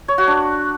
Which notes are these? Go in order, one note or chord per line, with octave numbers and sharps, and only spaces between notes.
C#5
F#4
D4